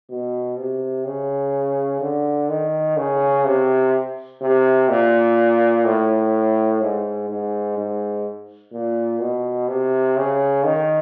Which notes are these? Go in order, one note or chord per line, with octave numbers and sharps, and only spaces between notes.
B2
C3
C#3
D3
D#3
C#3
C3
C3
A#2
A2
G#2
G#2
G#2
A#2
B2
C3
C#3
D#3